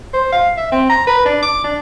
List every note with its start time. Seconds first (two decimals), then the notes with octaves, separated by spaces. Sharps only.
0.13 C5
0.32 F5
0.57 E5
0.72 C4
0.89 A#5
1.07 B4
1.25 D4
1.43 D6
1.64 D4